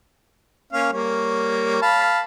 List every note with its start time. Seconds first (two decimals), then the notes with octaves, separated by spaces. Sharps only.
0.73 A#3 C#4 F5
0.93 G3 A#3 C#5
1.82 F5 A5 B5